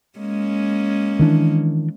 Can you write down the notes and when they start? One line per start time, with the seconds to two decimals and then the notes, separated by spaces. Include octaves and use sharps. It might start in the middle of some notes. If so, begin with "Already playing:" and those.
0.19 G#3 A#3 C#4
1.19 D#3 E3 D4